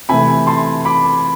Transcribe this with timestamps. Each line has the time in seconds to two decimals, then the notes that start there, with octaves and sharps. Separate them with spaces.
0.09 C3 E3 A3 G#5 B5
0.47 A5 C6
0.85 B5 D6